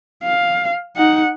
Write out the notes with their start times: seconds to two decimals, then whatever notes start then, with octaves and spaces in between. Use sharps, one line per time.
0.23 F5
0.96 D#4 F#5